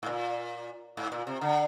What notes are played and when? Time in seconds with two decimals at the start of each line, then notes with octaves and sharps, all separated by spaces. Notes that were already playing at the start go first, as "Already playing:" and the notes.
0.03 G#2
0.06 A#2
0.97 G#2
1.12 A#2
1.27 C3
1.41 D3